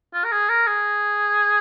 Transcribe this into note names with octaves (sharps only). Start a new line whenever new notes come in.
F4
A#4
G#4
A#4
G#4